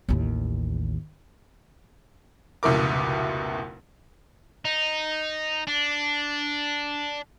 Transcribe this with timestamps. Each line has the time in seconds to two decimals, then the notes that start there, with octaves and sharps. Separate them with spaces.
0.08 A1 D#2
2.63 F1 C#2 B2 E4 A#4 D6
4.65 D#4
5.68 D4